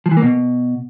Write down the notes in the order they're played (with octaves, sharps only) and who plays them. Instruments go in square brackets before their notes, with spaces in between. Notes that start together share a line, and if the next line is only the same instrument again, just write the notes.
[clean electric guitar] F3
E3
A#3
B2